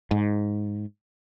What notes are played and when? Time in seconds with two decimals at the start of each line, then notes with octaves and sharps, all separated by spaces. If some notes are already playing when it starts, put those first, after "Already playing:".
0.11 G#2